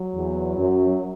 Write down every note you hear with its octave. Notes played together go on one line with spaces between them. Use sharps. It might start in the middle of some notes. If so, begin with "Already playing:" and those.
Already playing: F#3
E2
F#2